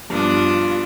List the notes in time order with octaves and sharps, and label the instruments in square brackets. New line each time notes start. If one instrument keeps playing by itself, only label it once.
[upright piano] G2 B2 F3 [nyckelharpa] D4 D#6 [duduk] F4